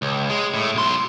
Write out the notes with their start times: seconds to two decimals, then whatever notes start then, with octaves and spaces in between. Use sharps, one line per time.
0.02 C#2
0.29 G#3
0.54 A2
0.75 B1 C6